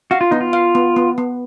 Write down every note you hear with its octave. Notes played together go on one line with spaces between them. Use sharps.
F#4 F5
F4
B3 D#4
F4
F5
B3
B3
B3